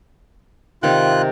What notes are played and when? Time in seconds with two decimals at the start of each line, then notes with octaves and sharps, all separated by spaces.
0.83 C3 D#3 F4 F#6